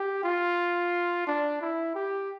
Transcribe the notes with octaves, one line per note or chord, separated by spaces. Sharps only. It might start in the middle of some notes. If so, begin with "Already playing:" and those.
Already playing: G4
F4
D4
E4
G4